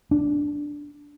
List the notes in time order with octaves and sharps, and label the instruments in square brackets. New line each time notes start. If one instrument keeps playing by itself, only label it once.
[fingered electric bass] D4